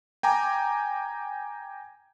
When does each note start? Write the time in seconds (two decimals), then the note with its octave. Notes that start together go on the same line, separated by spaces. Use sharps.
0.23 G5 G#5 A#5 D6